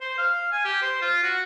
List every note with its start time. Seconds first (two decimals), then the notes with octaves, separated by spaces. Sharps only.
0.01 C5
0.18 F5
0.52 G#5
0.65 G4
0.82 C5
1.02 F4
1.23 F#4